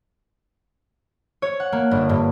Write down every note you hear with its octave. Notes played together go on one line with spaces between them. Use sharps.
C#5
F#5
A#3
G1
G2